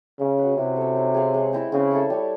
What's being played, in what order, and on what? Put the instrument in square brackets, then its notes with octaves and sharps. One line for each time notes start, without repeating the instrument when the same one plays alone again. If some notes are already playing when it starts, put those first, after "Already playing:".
[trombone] C#3 [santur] C#4
[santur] F#4 B4
[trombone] C3 [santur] E4
[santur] A4
C#5
D#4
G#4 C#5 F5
G#3
C4 E4
[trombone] C#3 [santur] C4
[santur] E4 A4 C#5
G3